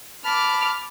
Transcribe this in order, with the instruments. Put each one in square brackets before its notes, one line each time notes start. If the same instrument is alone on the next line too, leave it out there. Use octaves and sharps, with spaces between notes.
[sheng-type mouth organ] A5 B5 [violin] D6 F6